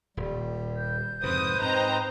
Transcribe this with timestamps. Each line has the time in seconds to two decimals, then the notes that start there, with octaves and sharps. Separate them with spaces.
0.17 D#1 G3
0.77 G6
1.23 F2 G#2 C3 B4 C5 D#6
1.62 G#2 C4 D#5 A#5